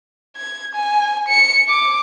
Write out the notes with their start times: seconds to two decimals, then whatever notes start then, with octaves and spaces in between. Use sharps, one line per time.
0.36 G#6
0.75 G#5
1.28 C#7
1.69 D6